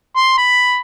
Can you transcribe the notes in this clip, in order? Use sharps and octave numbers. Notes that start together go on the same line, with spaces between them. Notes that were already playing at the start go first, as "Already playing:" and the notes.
C6
B5